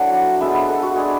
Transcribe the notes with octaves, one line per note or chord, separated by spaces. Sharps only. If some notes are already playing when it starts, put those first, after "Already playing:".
Already playing: F#3 A3 D4 E4 F#5
G#3 B3 D4 E5
B4
A4
F#4
G#3 D4 G#4